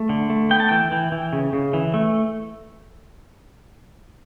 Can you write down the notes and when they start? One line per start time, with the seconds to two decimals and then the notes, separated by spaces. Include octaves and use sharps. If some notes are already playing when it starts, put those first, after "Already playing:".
Already playing: A3
0.09 D3
0.30 A3
0.50 B3 G5
0.60 A5
0.69 E3 G5
0.92 E3
1.12 E3
1.33 C#3
1.53 C#3
1.73 E3
1.94 A3